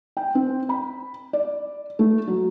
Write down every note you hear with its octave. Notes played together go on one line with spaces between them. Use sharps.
G5
C4
B5
D5
A3
F#3